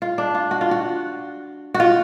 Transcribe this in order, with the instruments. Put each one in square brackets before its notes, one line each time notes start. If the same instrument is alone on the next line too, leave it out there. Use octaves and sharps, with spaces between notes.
[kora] F4
D4
F4
F#4
F4
F#4
F#4
F4